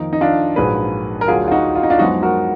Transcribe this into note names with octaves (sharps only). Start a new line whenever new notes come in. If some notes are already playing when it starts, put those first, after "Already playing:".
Already playing: F2 D#3 A#3 D#4
D#4
D4 F4
A#1 G#2 F#3 A#3 G#4 B4
A#4
D2 D3 F#3 F4 G#4
F4
D#4 F#4
F4
D#4
D4 F4
F#2 F3 G#3 B3 D#4 F#4
F#4 A#4